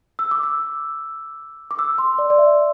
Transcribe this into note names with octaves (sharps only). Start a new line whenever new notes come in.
E6
D6
E6
D6
E6
C6
D5
D5
E5